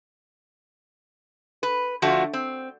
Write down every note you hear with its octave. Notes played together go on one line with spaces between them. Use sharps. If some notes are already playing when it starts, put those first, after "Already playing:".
B4
D3 F3 A3 F4 F#4
C4